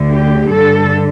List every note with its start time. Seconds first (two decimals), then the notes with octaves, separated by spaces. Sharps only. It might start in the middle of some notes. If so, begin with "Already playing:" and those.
Already playing: D2 D3
0.10 G4
0.50 G2 D3 A4